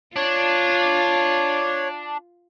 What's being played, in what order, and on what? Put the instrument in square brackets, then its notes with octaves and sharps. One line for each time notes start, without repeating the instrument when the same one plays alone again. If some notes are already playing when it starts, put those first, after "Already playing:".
[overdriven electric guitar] D4 [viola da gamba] F4 [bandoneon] C#5